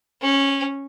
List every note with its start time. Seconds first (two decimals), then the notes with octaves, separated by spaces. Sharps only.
0.21 C#4